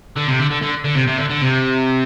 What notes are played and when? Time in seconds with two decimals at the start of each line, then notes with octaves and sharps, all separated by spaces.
0.16 D3
0.28 C3
0.39 D3
0.51 D3
0.62 D3
0.84 D3
0.95 C3
1.07 C3
1.18 D3
1.30 D3
1.42 C3